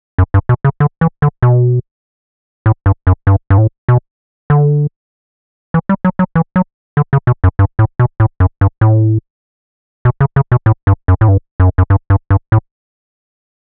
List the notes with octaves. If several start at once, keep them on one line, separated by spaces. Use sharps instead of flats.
F#2
G2
B2
C#3
D3
E3
D3
B2
A2
G2
F#2
G2
G2
A2
B2
D3
E3
G3
F#3
F#3
E3
F#3
D3
C#3
B2
F#2
G2
A2
B2
A2
F#2
G2
A2
B2
C#3
C#3
B2
A2
G2
F#2
A2
G2
F#2
F#2
G2
G2
G2
A2